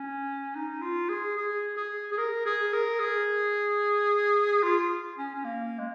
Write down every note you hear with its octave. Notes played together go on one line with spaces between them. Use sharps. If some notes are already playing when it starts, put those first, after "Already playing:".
Already playing: C#4
D#4
F4
G#4
G#4
G#4
G#4
A#4
G#4
A#4
G#4
F4
C#4
C#4
A#3
G#3